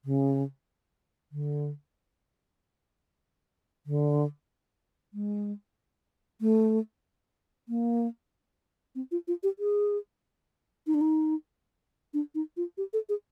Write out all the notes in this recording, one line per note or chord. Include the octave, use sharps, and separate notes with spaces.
C#3
D3
D3
G#3
A3
A#3
C4
F4
F4
G4
G#4
D#4
D4
D#4
D4
D#4
F4
G4
A4
G#4